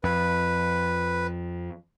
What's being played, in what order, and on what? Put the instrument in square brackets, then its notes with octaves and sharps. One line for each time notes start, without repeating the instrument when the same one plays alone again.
[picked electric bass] F2 [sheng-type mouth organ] B4